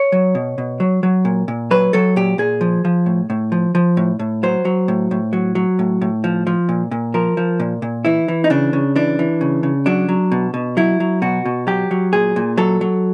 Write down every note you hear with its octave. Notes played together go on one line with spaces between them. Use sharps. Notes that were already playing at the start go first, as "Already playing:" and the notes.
Already playing: C#5
F#3
B2
B2
F#3
F#3
A#2
A#2
F#3 B4
F#3 A4
A#2 G4
A#2 G#4
F3
F3
A2
A2
F3
F3
A2
A2
F#3 C5
F#3
A2
A2
F#3
F#3
A2
A2
F3
F3
A#2
A#2
F3 A#4
F3
A#2
A#2
E3 E4
E3
D#4
C#3 D4
C#3
E3 D4
E3
C#3
C#3
F#3 D4
F#3
B2
B2
F#3 E4
F#3
B2 F#4
B2
F#3 G4
F#3
A#2 G#4
A#2
F#3 A4
F#3